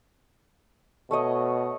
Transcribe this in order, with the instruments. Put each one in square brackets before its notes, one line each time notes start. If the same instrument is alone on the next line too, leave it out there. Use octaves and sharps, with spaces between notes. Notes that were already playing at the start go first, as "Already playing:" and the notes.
[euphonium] B2 [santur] A3 C#5 D#5